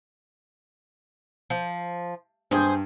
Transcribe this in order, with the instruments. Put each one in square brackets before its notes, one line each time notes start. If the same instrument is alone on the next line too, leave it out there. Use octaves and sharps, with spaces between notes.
[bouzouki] F3
[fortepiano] G2 [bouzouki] G#4 C5